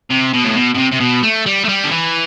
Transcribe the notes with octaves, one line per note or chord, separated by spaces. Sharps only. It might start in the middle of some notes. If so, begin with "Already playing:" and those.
C3
B2
A2
B2
B2
C3
C3
B2
A3
G3
A3
G3
D3
E3